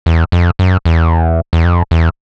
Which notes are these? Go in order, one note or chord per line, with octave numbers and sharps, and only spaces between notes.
E2
F2
F#2
E2
E2
F2
E2